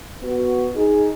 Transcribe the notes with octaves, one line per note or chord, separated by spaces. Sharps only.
B3 F#4
D#4 G#4